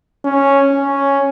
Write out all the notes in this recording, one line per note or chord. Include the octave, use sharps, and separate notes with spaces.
C#4
C#4